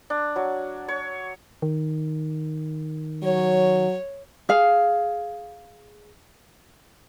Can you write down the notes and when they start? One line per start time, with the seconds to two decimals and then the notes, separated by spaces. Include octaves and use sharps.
0.10 D4
0.36 F#3
0.88 C#5
1.62 D#3
3.23 F#3 C#5
4.49 G#4 F5